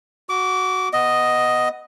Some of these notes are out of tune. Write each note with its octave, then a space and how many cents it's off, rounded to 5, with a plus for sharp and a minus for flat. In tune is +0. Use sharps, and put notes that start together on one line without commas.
F#4 +0 D6 -20
B3 +0 D#5 +0